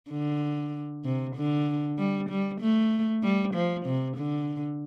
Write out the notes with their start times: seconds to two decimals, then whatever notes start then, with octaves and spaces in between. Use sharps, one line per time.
0.11 D3
1.05 C3
1.36 D3
1.99 G3
2.30 G3
2.61 A3
3.23 G3
3.54 F3
3.86 C3
4.17 D3